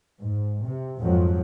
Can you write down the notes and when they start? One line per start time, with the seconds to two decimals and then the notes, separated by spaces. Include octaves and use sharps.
0.21 G#2
0.63 C3
1.01 F2 G#2 F3 F#3